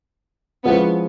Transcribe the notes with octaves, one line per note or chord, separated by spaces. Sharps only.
F3 G#3 B3 C#4 E4